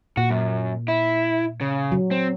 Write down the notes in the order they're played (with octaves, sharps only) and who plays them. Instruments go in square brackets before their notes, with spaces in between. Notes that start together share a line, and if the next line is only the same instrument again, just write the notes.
[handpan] A#2 [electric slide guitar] F#4
[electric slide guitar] F#2
E4
C#3
[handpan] F#3
[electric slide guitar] C4